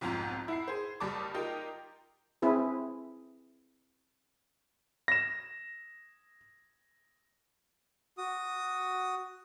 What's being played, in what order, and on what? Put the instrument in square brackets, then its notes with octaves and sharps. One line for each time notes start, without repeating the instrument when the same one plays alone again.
[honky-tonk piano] B1 F2 G#2 F4 A#5
E4 F#5 C7
G#4 C5
F#1 G3 D5 A5 D6 D#6
D#4 F4 G4 A#4 G5
[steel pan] C4 E4 G#4 B4
[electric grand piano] A#6 E7
[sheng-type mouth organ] F#4 D#6